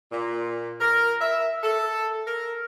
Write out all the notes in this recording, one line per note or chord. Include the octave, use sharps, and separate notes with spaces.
A#2
A#4
E5
A4
A#4